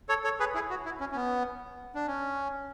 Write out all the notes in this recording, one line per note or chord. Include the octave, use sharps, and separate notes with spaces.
A4 C#5
A4 C#5
G#4 B4
E4 G#4
F#4
E4
C#4
C#4
B3
D4
C#4